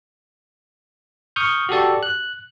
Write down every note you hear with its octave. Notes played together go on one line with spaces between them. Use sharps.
C#6 D#6 F6 G6
F#4 G4 A4 D5
F#6